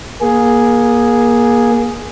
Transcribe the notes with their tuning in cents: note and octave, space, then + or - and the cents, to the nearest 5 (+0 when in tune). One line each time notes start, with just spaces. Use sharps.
A#3 +25 G#4 +0